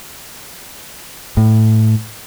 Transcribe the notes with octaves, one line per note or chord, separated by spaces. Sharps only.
A2